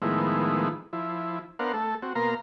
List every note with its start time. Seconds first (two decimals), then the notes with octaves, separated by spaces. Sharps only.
0.02 A2 D#3 F3 G#3 B3 E4
0.93 F3 E4
1.59 B3 D4 A#4 C5 F5 F#5
1.74 A3 A4
2.02 C4 F#4
2.15 B2 A#3 A#4 F5 A#5 C6